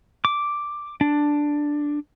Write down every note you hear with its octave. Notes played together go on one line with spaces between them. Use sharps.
D6
D4